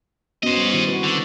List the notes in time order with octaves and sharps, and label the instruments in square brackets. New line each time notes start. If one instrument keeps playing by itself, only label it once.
[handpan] B3 C#4 F#4 [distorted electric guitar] C5 D#5
[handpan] G3
D#3 E4 F#4
C4 F#4 B4
[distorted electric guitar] D3